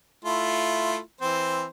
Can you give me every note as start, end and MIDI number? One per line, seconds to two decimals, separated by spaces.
0.25 0.98 57
0.25 0.98 64
0.25 0.98 65
1.21 1.66 52
1.21 1.66 60
1.21 1.66 72